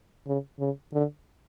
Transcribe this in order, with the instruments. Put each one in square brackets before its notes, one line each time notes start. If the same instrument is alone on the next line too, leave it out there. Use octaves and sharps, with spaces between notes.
[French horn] C#3
C#3
D3